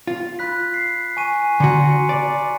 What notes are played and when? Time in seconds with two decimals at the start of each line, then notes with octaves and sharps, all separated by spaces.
0.07 F4
0.39 B5 F#6 B6
0.74 C7
1.17 G#5 C#6 D#7
1.60 D3 F#4 A#5 C6 C#7
2.09 D5